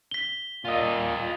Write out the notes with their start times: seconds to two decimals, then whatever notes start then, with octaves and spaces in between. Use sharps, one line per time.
0.11 B6 G7
0.65 A#2 F4 D#5